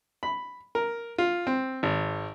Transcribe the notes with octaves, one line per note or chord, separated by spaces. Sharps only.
B5
A#4
F4
C4
G#1